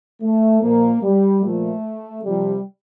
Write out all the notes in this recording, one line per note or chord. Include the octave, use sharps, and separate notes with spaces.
A3
A#2 F3 A#3
G3
A#2 F3 A3
C3 F3 G3